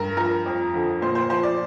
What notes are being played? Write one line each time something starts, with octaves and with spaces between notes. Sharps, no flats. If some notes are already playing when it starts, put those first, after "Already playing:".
Already playing: G2 A#4
F3 A#4
F2
D3 F3
A#2 C5
C5
F3 C5
D5